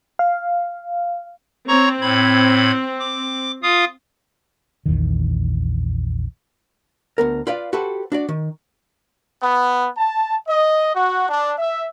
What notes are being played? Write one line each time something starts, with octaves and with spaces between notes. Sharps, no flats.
F5
C4 C#5 A#5 C#6
A2 B5 G#6
D6
F4 F5 D#6
A#1 E2 D#3
D2 B3 A#4
F4 B4 D5 F5
F#4 G4 A4 B4 C5
D4 F#4 D5
D#3
B3
A5
D#5
F#4
D4
E5